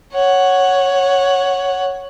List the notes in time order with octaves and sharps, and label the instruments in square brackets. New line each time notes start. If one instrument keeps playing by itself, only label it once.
[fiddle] C#5 F#5